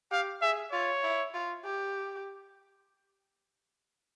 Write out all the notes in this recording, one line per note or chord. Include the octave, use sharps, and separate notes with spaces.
G4 F5
G#4 E5
F4 C#5
E4
F4
G4